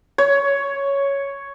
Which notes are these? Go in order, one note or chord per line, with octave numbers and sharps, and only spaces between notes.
C#5